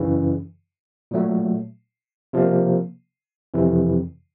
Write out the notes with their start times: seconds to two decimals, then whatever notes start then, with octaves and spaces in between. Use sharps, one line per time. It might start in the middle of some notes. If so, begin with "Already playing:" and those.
Already playing: F#2 C#3 E3
1.11 A#2 F#3 A3
2.33 C3 F3 A#3
3.54 F2 C3 E3